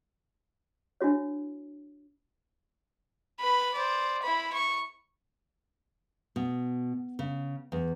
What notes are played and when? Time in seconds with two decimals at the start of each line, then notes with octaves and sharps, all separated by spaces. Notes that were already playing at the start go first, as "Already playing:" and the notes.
1.01 D4 E4 F#4 C#5
3.40 B4 B5
3.74 C5 D5
4.22 E4 B5
4.53 C#6
6.36 B2
7.19 C#3
7.72 E2